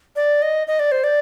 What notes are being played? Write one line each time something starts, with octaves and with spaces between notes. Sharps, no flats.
D5
D#5
D#5
D5
C5
D5